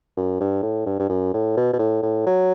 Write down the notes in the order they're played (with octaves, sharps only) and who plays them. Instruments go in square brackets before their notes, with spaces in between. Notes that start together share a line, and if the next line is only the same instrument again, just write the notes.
[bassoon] F#2
G2
A2
G2
G2
F#2
A2
B2
B2
A2
A2
F#3